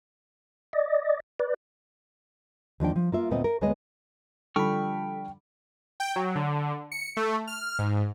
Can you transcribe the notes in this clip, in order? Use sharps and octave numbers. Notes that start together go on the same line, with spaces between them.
D5 D#5
B4 D5
D#2 F3 D4 G5
F3
A#3 F4 E5
D2 A#2 B3 C4 D#5
A#4
D2 G#3 B3 B4 C#5 D#5
D3 F3 G3 A4 G5 B5 C#6 F6
G5
F#3
D3
C#7
A3
F6
G#2